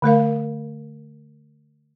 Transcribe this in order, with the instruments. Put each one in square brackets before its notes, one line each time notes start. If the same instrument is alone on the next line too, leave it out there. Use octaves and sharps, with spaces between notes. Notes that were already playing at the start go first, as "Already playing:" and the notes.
[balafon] D3 A3 A#4 F5